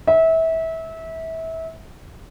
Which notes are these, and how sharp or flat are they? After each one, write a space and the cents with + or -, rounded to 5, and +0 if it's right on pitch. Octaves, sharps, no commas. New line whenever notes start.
E5 -25